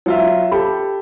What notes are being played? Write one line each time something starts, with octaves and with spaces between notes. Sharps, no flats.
F#3 F4 E5
G4 A4 B5